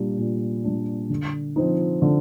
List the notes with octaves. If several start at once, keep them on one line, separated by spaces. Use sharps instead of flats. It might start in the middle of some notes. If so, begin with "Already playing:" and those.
Already playing: A#2 G3 D4
A#2
G3 D4
D3
F3 C4 D#4
D3